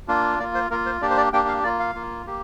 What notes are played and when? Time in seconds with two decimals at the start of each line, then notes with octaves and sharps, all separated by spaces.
0.08 A#3 D4 F4
0.39 A#3 D5
0.43 F4
0.55 C5
0.70 A#3 F4 A#4
0.86 C5
1.01 A#3 D4 G4 D5
1.10 C5
1.17 D5
1.33 A#3 D4 G4 G5
1.48 F5
1.64 A#3 F4 D5
1.79 F5
1.95 A#3 F4
2.26 A#3 G4